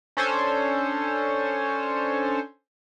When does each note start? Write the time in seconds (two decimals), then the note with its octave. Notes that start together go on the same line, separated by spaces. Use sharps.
0.17 C#4 D4 A4 C5 C#5 G#5